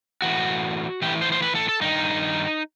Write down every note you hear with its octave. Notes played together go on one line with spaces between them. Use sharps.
A2 E3 F#4
A2 E3 G4
C5
C5
B4
A4
A4
G2 D#3 D#4